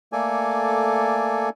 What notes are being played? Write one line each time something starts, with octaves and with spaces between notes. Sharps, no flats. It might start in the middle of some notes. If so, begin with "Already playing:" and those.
A3 A#3 A4 D5 G#5